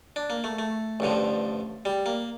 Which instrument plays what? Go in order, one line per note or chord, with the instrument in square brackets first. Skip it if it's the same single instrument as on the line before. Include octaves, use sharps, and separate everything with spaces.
[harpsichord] D4
A#3
A3
A3
A1 G2 D3 F3
G3
A#3